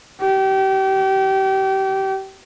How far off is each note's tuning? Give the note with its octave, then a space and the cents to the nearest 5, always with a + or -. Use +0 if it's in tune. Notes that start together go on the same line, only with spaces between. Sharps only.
G4 -30